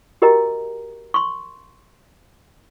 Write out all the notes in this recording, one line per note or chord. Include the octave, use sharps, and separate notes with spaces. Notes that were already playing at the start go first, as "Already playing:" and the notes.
F#4 G4 A#4 D#5 G5 A#5
C6 C#6